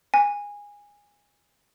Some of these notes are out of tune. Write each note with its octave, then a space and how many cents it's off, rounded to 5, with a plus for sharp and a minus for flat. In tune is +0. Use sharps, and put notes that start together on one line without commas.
G#5 -15